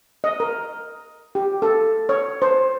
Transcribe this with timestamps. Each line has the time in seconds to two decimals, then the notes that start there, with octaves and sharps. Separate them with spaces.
0.24 D#5
0.40 A#4
1.35 G4
1.62 A4
2.09 C#5
2.42 C5